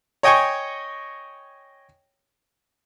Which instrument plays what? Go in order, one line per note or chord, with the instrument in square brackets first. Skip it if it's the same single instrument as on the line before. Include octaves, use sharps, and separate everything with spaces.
[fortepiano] C#5 D#5 G5 G#5 C#6